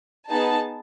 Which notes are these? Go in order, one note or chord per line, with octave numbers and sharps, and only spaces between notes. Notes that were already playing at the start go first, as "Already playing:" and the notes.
B3 D#4 G#4 A5